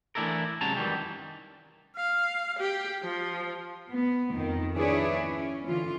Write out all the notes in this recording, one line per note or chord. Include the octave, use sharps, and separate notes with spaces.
E3 A3 D4 E4 A4 A#4
C3 F#3 G#3 C#4 A5 A#5
F#2 D#3 E3 G3
F5
G4
F3
B3
F2 D#3
D4 E4 G#4 B4 C#5 D5
C#4
D3 E3 F4